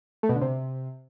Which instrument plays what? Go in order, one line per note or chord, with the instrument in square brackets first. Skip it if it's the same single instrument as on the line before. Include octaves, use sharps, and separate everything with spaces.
[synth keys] A3
B2
D3
C3